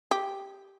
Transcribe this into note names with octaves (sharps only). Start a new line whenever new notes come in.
G4